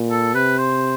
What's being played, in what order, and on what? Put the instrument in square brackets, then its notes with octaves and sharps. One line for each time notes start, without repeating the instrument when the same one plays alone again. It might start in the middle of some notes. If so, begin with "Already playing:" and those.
Already playing: [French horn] A#2
[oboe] A4
[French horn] C3 [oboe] B4
[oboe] C5